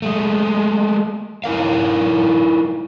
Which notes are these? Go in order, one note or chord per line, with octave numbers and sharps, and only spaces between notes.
G#3 A3
D#4 E4 A#4 F5